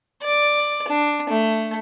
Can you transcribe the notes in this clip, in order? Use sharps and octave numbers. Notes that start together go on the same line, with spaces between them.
D5
D4
A3